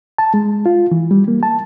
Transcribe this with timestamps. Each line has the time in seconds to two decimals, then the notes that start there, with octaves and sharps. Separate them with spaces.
0.18 A5
0.34 G#3
0.66 F4
0.92 E3
1.11 G3
1.28 A#3
1.43 A5